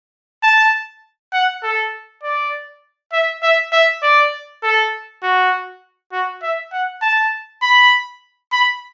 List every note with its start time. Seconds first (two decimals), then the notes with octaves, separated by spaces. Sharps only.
0.43 A5
1.33 F#5
1.63 A4
2.23 D5
3.13 E5
3.43 E5
3.73 E5
4.03 D5
4.63 A4
5.23 F#4
6.12 F#4
6.42 E5
6.73 F#5
7.02 A5
7.62 B5
8.52 B5